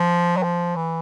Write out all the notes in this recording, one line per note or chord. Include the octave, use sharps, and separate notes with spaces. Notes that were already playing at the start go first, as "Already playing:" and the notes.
Already playing: F3
F#3
F3
E3